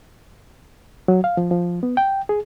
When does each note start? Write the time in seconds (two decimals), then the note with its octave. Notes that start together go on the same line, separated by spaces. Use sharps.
1.08 F#3
1.24 F5
1.37 F3
1.51 F3
1.83 B3
1.97 G5
2.29 G#4